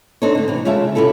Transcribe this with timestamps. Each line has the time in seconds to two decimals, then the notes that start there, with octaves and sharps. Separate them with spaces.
0.22 C4 D4 D#4 A4 C#5
0.35 D3 A3
0.48 C3 E3
0.65 C#3 G#3 F4 G4 E5 A5
0.95 C3 C#4 E4 F4 A4